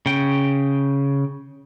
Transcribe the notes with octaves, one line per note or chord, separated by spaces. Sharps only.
C#3 G5